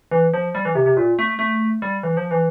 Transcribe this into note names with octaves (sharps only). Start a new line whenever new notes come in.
E3
F3
G3
E3
C3
C3
A#2
A3
A3
G3
E3
F3
E3